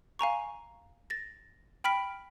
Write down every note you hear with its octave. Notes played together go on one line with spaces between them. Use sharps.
F5 G#5 A#5 C#6
A6 A#6
G5 B5 F6 B6 D7